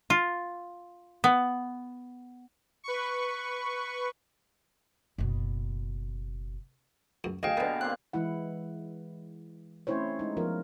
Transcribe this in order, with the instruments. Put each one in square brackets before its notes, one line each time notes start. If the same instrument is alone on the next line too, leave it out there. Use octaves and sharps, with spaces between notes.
[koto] F4
B3
[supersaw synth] B4 C#6
[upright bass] F#1 B2
[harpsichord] C#2 F#2
[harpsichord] D2 C#3 [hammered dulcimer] G#4 F5 [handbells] D#5 G5
[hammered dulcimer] B2 D3 [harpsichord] A#4 B4
[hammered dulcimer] A#3 C4 [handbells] F#6
[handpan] E3 G#3 E4 F#5
A3 C4 C#4 E4 C5 C#5
G#3 D#4
F3 B3 F4 A#4